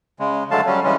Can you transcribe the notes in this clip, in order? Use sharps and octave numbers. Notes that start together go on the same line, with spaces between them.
C#3 G#3
D3 F#3 G#3 A3 F5 A5
F#3 G3 C#4
C#3 E3 G3 G#3 C#4